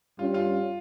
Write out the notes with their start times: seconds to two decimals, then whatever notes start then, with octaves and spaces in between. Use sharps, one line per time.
0.19 G2 G3 C#4 F4
0.34 F4